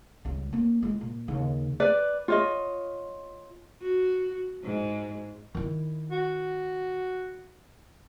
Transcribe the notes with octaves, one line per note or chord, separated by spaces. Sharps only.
C#2 G3
A#3 C#4
G#3 F4
A#2
D#2 C#3
B4 D5
F4 C#5 D#5
F#4
G#2
D#3 E4
F#4